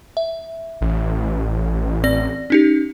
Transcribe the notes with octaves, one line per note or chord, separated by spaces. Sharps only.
E5
A1
C4 D5 A#6
C#4 D#4 G4